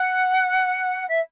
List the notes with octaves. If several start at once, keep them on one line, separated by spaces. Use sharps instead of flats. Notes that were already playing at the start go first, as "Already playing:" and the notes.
Already playing: F#5
E5